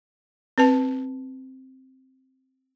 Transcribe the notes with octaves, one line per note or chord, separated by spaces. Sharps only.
C4 B4 A5